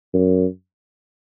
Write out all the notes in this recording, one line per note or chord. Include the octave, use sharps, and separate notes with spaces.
F#2